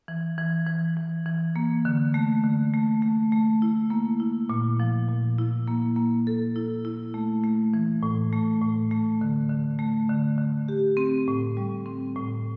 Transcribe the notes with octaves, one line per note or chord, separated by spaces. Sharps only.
E3
E3
E3
E3
E3
A#3
D3
A3
D3
A3
A3
A3
E4
A#3
E4
A#2
F3
A#2
E4
A#3
A#3
A4
E4
E4
A3
A3
E3
A2
A3
A2
A3
D3
D3
A3
D3
D3
G4
C4
A2
G3
C4
A2